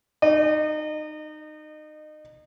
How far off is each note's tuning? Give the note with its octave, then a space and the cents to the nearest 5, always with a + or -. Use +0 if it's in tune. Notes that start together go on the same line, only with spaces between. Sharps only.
D#4 -20 D#5 -30